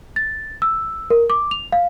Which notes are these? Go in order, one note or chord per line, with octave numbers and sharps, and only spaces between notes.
A6
E6
A#4
D6
F7
F5